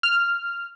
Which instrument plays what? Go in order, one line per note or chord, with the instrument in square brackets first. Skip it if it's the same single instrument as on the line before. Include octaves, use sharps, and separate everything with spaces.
[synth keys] F6